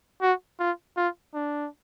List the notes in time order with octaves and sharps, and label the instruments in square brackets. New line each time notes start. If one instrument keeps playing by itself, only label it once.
[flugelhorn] F#4
F4
F4
D4